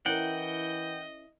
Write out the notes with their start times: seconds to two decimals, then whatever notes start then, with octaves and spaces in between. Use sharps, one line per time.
0.06 E3 C#4 E4 A#4 D#5 F#5 G5